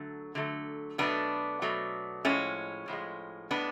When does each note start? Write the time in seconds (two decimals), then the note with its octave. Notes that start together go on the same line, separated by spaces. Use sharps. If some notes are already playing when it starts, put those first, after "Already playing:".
Already playing: D3 F#3 A3
0.35 D3 F#3 A3
0.98 B2 F#3 A3 B3 D4
1.62 B2 F#3 A3
2.25 A2 F3 G#3 A3 C#4
2.88 A2 F3 G#3
3.51 A2 G#3 B3 D4